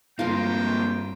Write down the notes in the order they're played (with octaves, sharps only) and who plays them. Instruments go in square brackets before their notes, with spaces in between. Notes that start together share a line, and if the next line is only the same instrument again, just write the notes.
[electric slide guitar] G2 C4 [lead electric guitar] D3 A#3 [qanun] F4 A#4 [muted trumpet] G5